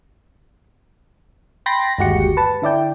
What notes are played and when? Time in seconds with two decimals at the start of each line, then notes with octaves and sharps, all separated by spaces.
1.66 G5 B5 C6 A6 A#6
1.98 G1 D#2 G#3 F#4 G4 C#7
2.37 B4 A5
2.62 D3 E4 D5 G5